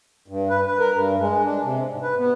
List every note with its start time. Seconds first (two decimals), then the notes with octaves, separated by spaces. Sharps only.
0.28 G2
0.50 B4
0.66 B4
0.79 A#4
0.94 G2
1.20 G#3
1.44 D4
1.64 C3
1.89 G#2
2.02 B4
2.18 B3